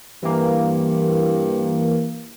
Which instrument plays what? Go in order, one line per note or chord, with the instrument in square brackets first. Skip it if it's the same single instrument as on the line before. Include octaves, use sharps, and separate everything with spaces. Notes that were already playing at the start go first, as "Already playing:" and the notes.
[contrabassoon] G2 [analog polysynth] E3 A#3